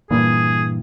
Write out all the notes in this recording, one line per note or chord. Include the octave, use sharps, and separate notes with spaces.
G2 A#2 E3 G#4